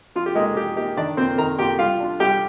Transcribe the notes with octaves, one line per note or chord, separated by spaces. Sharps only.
F3 F4
G4
G#3 A#3 D#4 G#4
F3 G4
A#3 D#4 G4
D#3 D4 D5
A#3 C4 F4 C5
D#3 A#4 A#5
A#3 F4 G4 G5
G3 F4 F5
D4 F4
G3 G4 G5